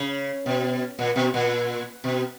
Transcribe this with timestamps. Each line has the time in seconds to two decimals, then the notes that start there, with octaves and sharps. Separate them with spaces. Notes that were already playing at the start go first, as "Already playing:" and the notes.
Already playing: C#3
0.46 B2
0.99 A#2
1.16 B2
1.34 A#2
2.04 B2